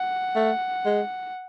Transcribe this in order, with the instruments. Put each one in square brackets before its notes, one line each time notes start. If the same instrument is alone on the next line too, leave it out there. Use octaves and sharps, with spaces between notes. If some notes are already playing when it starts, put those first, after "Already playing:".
Already playing: [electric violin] F#5
[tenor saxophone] A3
G#3